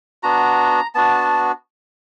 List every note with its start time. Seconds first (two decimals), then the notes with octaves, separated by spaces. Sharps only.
0.23 B3 D4 F#4 A#5
0.95 B3 D4 F#4 A5